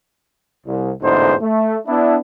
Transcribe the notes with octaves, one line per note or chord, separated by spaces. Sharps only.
C2
A1 E2 G#2 D3 D#4 C5
A3
B3 D4 E4